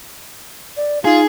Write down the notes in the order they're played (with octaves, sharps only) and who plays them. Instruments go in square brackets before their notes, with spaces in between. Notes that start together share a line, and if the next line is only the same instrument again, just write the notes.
[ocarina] D5
[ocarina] D#4 [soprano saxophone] F4 [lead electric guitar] G#4